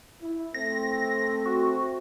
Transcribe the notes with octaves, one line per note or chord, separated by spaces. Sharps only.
E4
A3 C4 A#6
F#4